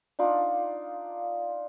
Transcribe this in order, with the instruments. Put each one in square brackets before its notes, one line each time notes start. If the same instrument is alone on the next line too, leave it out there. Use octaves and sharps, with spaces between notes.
[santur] D4 D#4 F4 D5